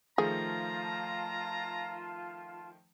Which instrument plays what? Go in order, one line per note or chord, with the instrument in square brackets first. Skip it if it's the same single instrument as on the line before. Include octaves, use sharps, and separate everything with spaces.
[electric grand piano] D#3 F3 A3 [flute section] F4 A5 [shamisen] G#4 [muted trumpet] A#5